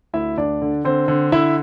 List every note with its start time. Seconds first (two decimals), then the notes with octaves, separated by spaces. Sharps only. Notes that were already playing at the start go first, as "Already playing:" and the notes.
0.13 D2 E4 E5
0.38 D2 D4 D5
0.62 D3
0.84 D3 C4 C5
1.08 D3
1.32 D3 E4 E5